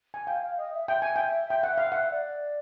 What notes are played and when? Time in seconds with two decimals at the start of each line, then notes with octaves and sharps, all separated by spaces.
0.14 G#5
0.27 F5 G5
0.42 F5
0.57 D#5
0.73 E5
0.88 E5 G5
1.02 G#5
1.16 G5
1.50 G5
1.63 F#5
1.78 F5
1.92 F#5
2.11 D5